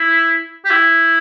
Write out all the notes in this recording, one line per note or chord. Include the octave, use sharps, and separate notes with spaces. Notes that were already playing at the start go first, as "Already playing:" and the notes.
Already playing: E4
G4
E4